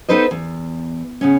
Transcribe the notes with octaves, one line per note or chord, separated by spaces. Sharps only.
B3 D#4 A4 B4 C5 D#5
E2
C#3 B3 C#4